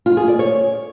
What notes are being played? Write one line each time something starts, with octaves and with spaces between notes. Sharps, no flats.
F4
G#4
D5
C#5